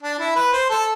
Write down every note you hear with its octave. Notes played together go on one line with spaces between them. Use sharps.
D4
E4
B4
C5
A4